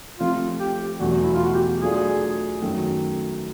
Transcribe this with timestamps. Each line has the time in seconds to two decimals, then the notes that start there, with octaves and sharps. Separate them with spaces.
0.19 C3 F3 A3 F4
0.60 G4
1.00 E2 B2 F#3 A3 F#4
1.23 E4
1.34 F4
1.44 F#4
1.54 G4
1.80 F#3 A3 D4 F4 G#4 A4
2.62 F#2 D#3 F#3 A3